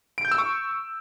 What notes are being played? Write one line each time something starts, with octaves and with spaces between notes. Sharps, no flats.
D7
G6
E6
C#6